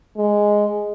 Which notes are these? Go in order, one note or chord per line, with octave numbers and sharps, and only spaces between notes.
G#3